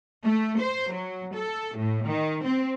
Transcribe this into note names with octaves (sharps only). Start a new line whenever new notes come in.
A3
C5
F#3
A4
A2
D#3
C4